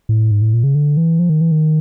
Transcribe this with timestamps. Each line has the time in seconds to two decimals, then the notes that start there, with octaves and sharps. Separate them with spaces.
0.09 A2
0.31 G#2
0.42 A2
0.54 A#2
0.64 C#3
0.75 D3
0.97 E3
1.19 F3
1.30 D#3
1.41 E3
1.52 D#3